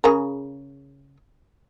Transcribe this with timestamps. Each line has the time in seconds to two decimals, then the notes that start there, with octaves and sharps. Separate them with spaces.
0.04 C#3 G#4 A#4